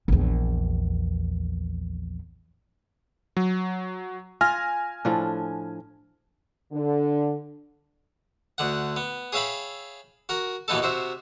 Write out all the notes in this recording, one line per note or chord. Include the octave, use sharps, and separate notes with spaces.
A#1 E2
F#3
F4 G#5 F6 A#6
A2 F3 D4
D3
D2 D3 F#5
B3
G#4 C#5 E5 F5 G5 B5
F#4 A#4
D#2 B2 E3 B3 D#4 A4
C3 F#4 C5 E5